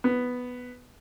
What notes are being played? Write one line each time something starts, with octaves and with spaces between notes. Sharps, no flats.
B3